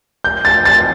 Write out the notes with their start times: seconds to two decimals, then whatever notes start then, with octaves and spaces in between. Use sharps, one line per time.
0.24 G6
0.45 A6
0.65 A6